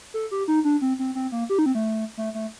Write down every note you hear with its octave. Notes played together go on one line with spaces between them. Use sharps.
A4
G4
D#4
D4
C4
C4
C4
A#3
G4
D#4
C4
A3
A3
A3